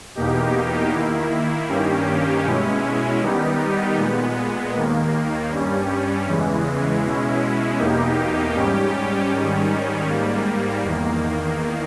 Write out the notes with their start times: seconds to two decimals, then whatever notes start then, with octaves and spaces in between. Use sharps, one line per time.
0.15 E2 B2 A#3 D#4 G4
0.92 D#3 A#3 E4
1.68 G2 D#3 A#3 C#4 G4
2.45 B2 G#3 C#4 E4
3.21 D#3 G3 B3 D#4 G4
3.97 A#2 G#3 B3
4.74 D#2 D#3 A#3
5.50 G2 G3 C#4
6.26 E2 C#3 E3 G#3
7.02 B2 G#3 C#4 E4
7.79 E2 B2 A#3 D#4 G4
8.55 G#2 G3 C#4 G4
9.31 G#2 D#3 G3 C#4
10.07 G#2 G3 A#3
10.84 E2 D#3 A#3